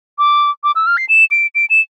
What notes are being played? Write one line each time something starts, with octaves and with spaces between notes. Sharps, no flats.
D6
D6
E6
F6
C7
E7
D7
D7
E7